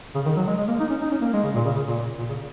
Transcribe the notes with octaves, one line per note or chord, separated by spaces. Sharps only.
C#3
D#3
F#3
G#3
G#3
A#3
D#4
C#4
D#4
C#4
A#3
G#3
C#3
A#2
C#3
C#3
A#2
A#2
C#3